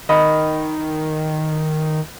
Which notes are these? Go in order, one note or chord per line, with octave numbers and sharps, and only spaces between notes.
D#3 D#5 B5